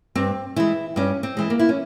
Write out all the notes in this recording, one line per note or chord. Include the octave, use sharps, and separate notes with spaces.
G2 C4
E3 G#3 E4
G2 C#4
C4
E3 G#3
A#3
E4
C#4